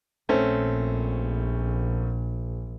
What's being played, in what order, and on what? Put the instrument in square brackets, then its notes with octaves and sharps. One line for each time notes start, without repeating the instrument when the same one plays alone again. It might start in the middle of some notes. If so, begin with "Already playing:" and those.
[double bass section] A#1 [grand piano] A3 C4 C#4